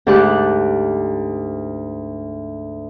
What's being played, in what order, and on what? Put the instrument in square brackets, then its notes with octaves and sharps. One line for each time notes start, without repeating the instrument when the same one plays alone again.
[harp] D2 G#2 D4 G4 D6 F#6